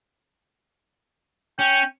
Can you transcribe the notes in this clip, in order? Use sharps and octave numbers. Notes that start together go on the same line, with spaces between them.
C#4 G5